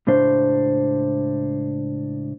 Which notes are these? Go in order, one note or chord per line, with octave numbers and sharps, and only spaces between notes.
C#2 A2 D4 C5